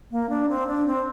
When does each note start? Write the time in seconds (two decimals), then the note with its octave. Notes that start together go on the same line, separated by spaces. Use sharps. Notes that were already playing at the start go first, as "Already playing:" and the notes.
0.11 A#3
0.29 D4
0.49 C4
0.67 D4
0.86 C4